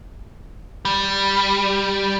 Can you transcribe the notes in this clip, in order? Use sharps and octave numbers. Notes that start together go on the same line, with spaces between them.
G3